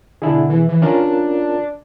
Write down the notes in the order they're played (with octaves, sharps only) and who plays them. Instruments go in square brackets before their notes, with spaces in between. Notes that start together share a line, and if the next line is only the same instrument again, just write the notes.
[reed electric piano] B2 E4 G#4 [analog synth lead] D3
[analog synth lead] E3
E3
[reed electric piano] C#4 F4 A#4 [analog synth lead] D4